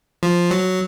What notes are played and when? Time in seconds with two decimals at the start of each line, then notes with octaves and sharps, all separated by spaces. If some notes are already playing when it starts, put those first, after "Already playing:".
0.23 F3
0.51 F#3